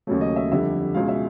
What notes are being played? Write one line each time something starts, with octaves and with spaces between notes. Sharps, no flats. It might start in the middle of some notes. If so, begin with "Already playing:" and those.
D#2 C#3 F#3 A3
D#5
E5
F2 D3 G3 E5
C#2 B2 G#3 F5
E5